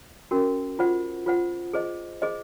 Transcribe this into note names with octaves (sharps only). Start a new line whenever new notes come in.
C#4 F#4 A#4
F4 C5 F#5
F4 C5 F#5
G#4 C5 D#5
G#4 C5 D#5